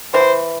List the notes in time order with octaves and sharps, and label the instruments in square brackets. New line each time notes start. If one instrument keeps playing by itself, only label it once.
[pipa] E3 [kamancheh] C5